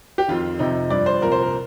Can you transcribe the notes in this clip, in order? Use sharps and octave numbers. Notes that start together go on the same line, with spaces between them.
G4
F2 D#3 F4
F2 C3 F3 D#4
G2 F3 D5
C5
C2 A#2 F3 A#4
C5
A#4